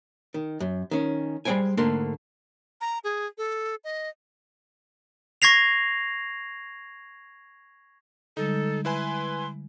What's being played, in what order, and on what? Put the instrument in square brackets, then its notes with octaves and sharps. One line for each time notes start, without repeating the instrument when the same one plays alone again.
[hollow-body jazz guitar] D#3
F#2
D#3 C#4
G3 G#3 A#3 C5 G5 G#5
G#2 D3 A3 A#3 C6
[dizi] A#5
G#4
A4
D#5
[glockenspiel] C#6 G#6 A#6 C7 F7
[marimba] D3 G3 G#3 [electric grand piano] D#4 [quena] A4
[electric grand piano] E4 B4 G#5 [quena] C6